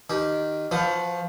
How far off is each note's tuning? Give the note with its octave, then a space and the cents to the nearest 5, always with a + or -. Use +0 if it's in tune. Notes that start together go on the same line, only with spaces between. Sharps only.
D#3 -10 G4 -15
F3 +0 F#4 -20 B4 +35